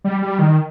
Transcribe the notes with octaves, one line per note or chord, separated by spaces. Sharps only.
G3
G3
D#3